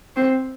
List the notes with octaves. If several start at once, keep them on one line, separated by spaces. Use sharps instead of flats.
C4